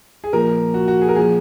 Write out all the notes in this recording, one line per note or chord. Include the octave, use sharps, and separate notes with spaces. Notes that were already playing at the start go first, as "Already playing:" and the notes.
G#4
A#2 F3 A#4
F#4
F#4
G#4
A#4
A#2 F3 G#4